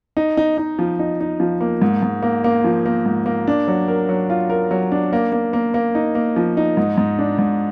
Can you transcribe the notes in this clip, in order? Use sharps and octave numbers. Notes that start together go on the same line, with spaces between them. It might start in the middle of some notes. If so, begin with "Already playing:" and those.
D#4
D#4
D#4
F3
D#4
D#4
F3
A#3
G#2
G#2
A#3
A#3
F3
A#3
G#2
A#3
D4
F#3
A#4
F#3
F4
A#4
F#3
D4
A#3
A#3
A#3
A#3
D#4
A#3
F3
D#4
G#2
G#2
D4
G#2